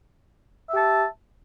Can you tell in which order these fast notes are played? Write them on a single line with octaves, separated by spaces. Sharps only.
E5 G4 A5